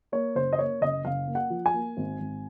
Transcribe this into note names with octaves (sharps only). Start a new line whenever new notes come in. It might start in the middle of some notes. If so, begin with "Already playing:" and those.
A#3 C#5
F#1 C5
D#5
A#3 C#5
F#1 D#5
F#1 F5
A#3
F#5
F3
G#5
A#3
G#1
G#1